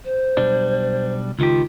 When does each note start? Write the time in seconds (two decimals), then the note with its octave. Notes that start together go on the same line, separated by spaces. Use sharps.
0.05 C5
0.37 B1 G3 D4
1.39 C#2 D#3 F4 G4